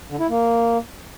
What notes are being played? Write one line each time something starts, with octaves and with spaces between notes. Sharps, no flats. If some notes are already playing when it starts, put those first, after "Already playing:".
D3
E4
A#3